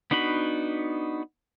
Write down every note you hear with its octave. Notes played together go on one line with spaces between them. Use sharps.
B3 D4 D#4 F#4 B5